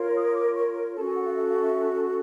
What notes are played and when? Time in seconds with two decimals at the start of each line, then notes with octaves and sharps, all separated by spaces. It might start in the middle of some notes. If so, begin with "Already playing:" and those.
Already playing: F4 A#4 C#5
0.15 D#6
0.35 D6
0.56 C#6
0.95 C#4 F#4 A4 A5
1.05 G#5
1.15 F#5
1.26 F5
1.36 E5
1.49 F5
1.63 E5